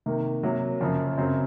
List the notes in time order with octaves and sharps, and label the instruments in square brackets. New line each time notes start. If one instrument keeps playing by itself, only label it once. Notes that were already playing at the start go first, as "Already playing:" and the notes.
[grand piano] C3 D#3 A#3
C3 F#3 A#3
F#2 C#3 F3
F#2 C#3 F#3 C4